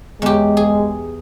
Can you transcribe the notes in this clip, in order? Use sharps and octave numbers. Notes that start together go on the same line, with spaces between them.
E2 G#3 G4
G#4